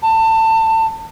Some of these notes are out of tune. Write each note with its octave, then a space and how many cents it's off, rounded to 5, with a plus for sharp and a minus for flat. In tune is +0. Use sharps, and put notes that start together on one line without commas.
A5 +25